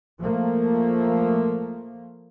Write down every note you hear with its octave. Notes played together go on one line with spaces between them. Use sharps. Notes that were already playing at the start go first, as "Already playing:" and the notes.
F3 A3 A#3